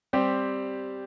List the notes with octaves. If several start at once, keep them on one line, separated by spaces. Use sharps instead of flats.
G3 C4 G4